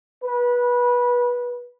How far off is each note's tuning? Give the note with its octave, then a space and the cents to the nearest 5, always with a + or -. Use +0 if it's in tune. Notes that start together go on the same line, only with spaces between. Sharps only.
B4 -20